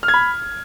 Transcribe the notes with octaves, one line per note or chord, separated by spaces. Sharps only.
F6
G#6
B5